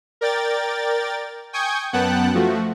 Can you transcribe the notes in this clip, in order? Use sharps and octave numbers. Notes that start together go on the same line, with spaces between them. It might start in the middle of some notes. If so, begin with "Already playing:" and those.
A#4 D5 G5 A6
G5 G#5 C#6 D#6 G6 G#6
F#2 B3 F#5 G5 A5 F#6
F3 A3 F#4